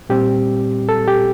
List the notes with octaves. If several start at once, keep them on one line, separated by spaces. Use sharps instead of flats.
A#2 G3 C4 G4
A4
G4